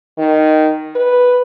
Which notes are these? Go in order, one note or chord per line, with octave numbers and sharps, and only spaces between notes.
D#3
B4